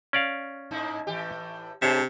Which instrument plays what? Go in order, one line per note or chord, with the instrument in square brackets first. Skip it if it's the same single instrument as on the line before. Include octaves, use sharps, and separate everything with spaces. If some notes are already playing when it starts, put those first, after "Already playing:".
[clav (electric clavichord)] C#4 D5 F5
[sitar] G#2 D#4 E4
A2 E3 G4
[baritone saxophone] C3 [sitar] G#3 D4 [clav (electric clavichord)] C5 C#5 E5